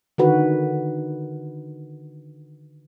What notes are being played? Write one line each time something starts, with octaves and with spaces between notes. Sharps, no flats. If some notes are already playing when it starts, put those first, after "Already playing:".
D3 D#3 F#4 B4